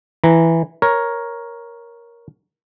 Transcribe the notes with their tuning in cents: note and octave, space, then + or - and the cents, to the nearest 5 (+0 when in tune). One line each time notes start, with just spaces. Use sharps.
E3 +0 A#5 +0
A#4 +10 C#5 +0